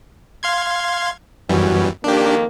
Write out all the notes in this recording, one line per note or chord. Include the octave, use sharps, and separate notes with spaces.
F5 C6 G#6
F#2 E3 G3 B3 C#4 F#4
F2 D#3 A#3 D4 G4